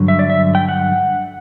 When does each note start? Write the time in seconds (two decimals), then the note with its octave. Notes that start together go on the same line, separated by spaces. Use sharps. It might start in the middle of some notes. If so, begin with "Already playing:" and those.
Already playing: G2 D3 F#3
0.08 E5
0.19 D5
0.30 E5
0.55 G5
0.69 F#5